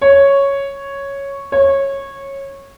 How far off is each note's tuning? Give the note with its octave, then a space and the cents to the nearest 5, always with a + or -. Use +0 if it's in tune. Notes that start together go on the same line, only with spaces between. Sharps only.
C#5 +0
C#5 -15